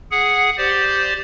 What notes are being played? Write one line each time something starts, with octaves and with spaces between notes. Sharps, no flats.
G#4 F#5
G4 C5 D5